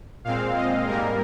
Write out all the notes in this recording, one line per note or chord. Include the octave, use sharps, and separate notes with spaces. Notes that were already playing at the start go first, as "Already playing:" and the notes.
A#2 G#3 C4 F5
D#5
G#2 G3 A#3 A#4